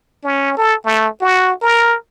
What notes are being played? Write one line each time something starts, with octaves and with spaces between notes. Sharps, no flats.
C#4
A4
A3
F#4
A#4